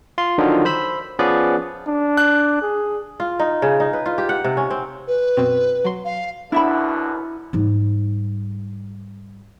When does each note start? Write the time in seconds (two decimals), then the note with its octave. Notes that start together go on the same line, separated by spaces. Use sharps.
0.18 F4 C6
0.38 D3 D#3 F3 F#3
0.65 C5 B5 E6
1.19 F3 B3 C#4 G#4 B4 D5
1.87 D4
2.17 F#6
2.62 G#4
3.20 F4
3.39 D#4
3.62 C#3
3.80 D#4
3.93 B4
4.06 F4
4.18 G4
4.29 F#5
4.44 C3
4.57 C#4
4.70 C4
5.07 B4
5.37 F#2 B2 C4
5.84 F#3 C6
6.05 F5
6.52 F#2 B2 D3 D4 E4 E5 B5
7.53 G#2 G3